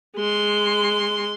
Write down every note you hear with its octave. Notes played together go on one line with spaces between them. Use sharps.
G#3 C6